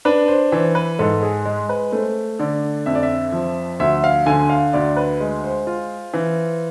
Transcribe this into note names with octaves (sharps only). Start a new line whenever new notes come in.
D4 B4
C5
E3 C5
B4
G#2 A4
G#4
G#3
B4
A3 C5
D3 D5
F2 E5
D5
E5
F3
D2 E5
F5
D3 G#5
F5
D2 D5
B4
G#3
C5
F4
E3